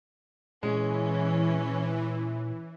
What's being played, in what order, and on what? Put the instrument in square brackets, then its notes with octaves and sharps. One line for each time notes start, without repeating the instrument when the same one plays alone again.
[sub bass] A#2 [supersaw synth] E3 [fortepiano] G#3 [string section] C#4